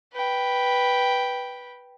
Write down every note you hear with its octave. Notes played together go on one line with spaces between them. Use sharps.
B4 G5